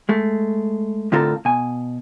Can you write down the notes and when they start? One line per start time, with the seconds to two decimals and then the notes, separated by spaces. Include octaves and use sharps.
0.09 G#3 A3
1.12 A2 D3 C4 F4 A4 A#4
1.45 B2 G#5